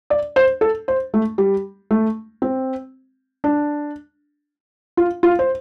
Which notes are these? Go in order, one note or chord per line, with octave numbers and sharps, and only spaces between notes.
D5
C5
A4
C5
A3
G3
A3
C4
D4
F4
F4
C5